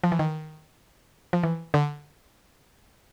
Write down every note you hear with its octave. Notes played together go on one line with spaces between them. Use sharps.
F3
E3
D#3
F3
E3
D3